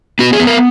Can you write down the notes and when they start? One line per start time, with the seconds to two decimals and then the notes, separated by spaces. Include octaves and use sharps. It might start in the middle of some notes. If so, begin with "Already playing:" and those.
0.19 B3 F#4
0.33 G#4
0.40 B3
0.47 A#4